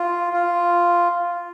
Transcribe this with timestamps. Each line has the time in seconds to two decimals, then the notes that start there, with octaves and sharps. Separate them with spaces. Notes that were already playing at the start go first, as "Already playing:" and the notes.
Already playing: F4
0.33 F4